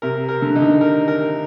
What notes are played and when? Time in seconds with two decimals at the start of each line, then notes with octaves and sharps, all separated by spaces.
0.02 C3 A#4
0.29 A#4
0.42 D3
0.56 D3 D#4
0.62 D#3
0.81 A#4
1.08 A#4